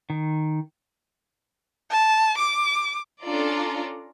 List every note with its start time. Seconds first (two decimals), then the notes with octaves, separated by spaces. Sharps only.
0.10 D#3
1.91 A5
2.38 D6
3.24 C#4 D4 F4 A4 D5 A#5